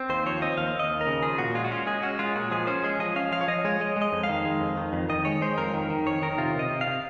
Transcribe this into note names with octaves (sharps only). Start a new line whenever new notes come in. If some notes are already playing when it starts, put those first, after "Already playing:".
Already playing: C4
D#2 C5
F3 C#5
C4 D#5
D#2 F5
D#2 D#5
D#2
A#4
C#3
F3 G#4
A#2 F#4
G#3 F4
F#4
C#4 F4
G#3 G#4
C#4 F#4
G#3 F4
A#2 F#4
F3 G#4
C#4 C5
G#3 G#4
F3 D#5
C#4 F5
F3 F5
C#5
F3 D#5
G#3 C#5
G#3 D#5
G#3
D#5
F2
F5
D#3
G#3
F2
D#3
F2
D#3 D#5
G#3 C#5
G#3 C5
F2 A#4
D#3
D#3
F2 C#5
D#3 A#4
C3 F4
C3 D#5
C3
F5
C3